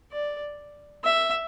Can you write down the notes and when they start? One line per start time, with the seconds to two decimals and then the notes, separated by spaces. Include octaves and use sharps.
0.12 D5
1.04 E5